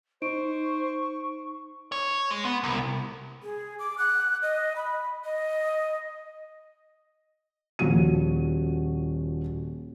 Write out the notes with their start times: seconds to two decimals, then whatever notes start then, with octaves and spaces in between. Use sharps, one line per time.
0.22 D#4 C5 C#6 D7
1.92 C#5
2.31 G#3
2.45 B3
2.64 C2
3.43 G#4
3.79 D6
3.98 F#6
4.42 D#5
4.76 B5
5.25 D#5
7.79 D#1 F3 F#4 D#7